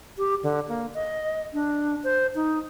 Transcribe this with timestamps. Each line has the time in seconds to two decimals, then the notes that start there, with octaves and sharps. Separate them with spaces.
0.18 G4
0.43 D3
0.68 A#3
0.94 D#5
1.54 D4
2.04 C5
2.35 D#4